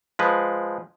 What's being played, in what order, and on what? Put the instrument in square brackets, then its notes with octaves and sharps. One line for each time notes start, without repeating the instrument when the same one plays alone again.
[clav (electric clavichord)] F3 G#3 B4